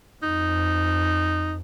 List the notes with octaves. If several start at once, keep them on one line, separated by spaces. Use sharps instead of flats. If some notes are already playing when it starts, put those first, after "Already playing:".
F2 D#4